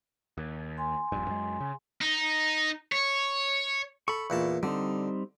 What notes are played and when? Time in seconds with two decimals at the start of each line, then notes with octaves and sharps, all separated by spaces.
0.37 D#2
0.78 G#5 C6
1.12 D#1 A#1 G2
1.28 F#2 G#3
1.61 C#3
2.01 D#4
2.92 C#5
4.08 A4 B5 C#6
4.30 E2 A#2 A5
4.63 D3 G3 C4 D#4